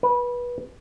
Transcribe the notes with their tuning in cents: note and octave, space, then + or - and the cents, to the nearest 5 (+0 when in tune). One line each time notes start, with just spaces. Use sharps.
B4 -20